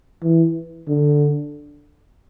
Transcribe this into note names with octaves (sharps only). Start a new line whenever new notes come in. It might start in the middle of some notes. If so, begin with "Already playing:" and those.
E3
D3